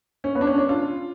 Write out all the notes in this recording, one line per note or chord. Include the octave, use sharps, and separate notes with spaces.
C#4
B3
D4
C#4
D4
F4